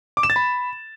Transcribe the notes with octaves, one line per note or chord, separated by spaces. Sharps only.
D6
E7
A6
B5